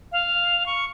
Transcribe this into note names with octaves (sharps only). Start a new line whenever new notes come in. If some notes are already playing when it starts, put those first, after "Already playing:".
F5
C#6